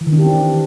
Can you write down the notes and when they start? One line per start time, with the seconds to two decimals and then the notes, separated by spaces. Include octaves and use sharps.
0.01 E3
0.07 D#3
0.13 D4
0.19 G4
0.25 C4